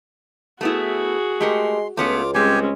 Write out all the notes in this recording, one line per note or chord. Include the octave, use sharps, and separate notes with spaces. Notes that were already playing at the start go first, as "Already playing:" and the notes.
A3 B3 E4 F#4 G#4
G#3 A3 G4 A#4 C6
C#2 A3 B3 C#4 F4 D6
G3 G#3 C4 C#4 G4 G#5